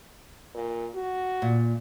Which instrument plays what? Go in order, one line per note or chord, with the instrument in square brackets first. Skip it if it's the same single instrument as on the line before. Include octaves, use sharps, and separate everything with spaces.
[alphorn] A#2
F#4
[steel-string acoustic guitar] A#2